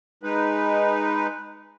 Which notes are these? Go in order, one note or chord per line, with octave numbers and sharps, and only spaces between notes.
G#3 D#4 B4